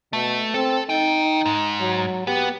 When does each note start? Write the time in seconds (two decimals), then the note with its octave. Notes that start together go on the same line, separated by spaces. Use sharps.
0.13 B2 A3
0.54 C4 A4
0.89 D#4 D#5 G5
1.46 G#2
1.80 F#3
2.27 B3 G4